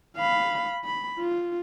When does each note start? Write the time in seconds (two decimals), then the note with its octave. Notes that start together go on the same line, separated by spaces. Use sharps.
0.17 F5 B5
0.84 B5
1.19 F4